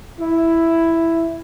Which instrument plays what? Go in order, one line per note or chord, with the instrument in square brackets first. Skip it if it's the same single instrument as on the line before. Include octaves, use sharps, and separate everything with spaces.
[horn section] E4